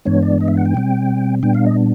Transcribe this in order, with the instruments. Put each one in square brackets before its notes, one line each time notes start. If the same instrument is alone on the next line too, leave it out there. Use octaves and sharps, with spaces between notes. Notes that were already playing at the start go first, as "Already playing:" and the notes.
[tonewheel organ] G2 E3 G#3 B3 D4 C#5
D5
D#5
E5
F#5
G5
B2 G3 C4
A#2 G3 B3 D4 G5
F5
D#5